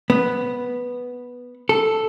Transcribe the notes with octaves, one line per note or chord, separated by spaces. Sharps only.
B3
A4